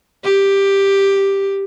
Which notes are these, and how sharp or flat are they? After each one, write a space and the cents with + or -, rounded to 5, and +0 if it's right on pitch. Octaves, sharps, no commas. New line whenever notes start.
G4 +5